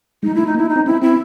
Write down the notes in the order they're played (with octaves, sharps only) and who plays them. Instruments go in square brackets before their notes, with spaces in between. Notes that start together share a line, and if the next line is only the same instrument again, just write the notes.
[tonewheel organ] G#3 [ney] D#4
[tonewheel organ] A3 [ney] E4
[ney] D#4
[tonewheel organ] A#3
[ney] E4
D#4
[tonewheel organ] C4
[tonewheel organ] C4 [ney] E4
[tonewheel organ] C4 [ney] E4